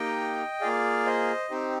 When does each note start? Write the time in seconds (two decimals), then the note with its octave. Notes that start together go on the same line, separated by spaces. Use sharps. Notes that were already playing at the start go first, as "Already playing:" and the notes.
Already playing: A#3 D#4 G4 D#5 G5
0.61 A#3 F4 G#4 D5 F5
1.06 C5 D#5
1.50 C4 D#4 G4 C5